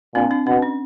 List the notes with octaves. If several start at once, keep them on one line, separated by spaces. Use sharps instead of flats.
A#2 C4 D4
C4 D4
B2 C4 D4
C#4